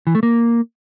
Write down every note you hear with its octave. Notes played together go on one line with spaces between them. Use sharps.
E3
A3
A#3